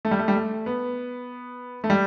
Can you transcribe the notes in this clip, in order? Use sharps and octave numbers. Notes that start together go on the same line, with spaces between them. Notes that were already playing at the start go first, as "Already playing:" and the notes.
A3
G3
A3
G3
A3
B3
A3
G3